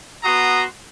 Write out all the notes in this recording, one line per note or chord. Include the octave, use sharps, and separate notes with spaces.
B3 F#4 A#5 C6 D#6